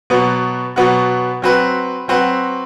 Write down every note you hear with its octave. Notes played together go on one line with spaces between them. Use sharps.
B2 F#3 B3 F#4
B2 F#3 B3 F#4
F#3 C4 F#4 B4
F#3 C4 F#4 B4